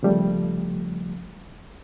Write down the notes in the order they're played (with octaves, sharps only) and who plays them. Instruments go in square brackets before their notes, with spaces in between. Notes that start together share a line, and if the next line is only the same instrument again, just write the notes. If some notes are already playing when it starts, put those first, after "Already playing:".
[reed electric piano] C#3 F3 G3 A3